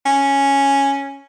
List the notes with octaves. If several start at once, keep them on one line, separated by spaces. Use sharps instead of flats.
C#4